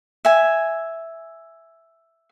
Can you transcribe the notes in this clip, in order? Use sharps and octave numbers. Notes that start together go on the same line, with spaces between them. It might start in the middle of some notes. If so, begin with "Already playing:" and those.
E5 G#5